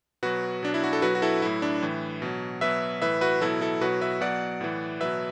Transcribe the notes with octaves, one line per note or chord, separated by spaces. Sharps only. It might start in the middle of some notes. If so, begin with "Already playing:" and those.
B2 F#3 F#4 B4
B2 F#3 D4
E4
F#4
A4
B2 F#3 F#4 B4
F#4
E4 A4
A2 F#3 E4
D4
A2 E3
B2 F#3
B2 F#3 B4 E5
A2 E3 B4 E5
F#4 B4
B2 F#3 E4 A4
E4 A4
B2 F#3 F#4 B4
B4 E5
B2 F#3 D5 F#5
A2 E3
B2 F#3 B4 E5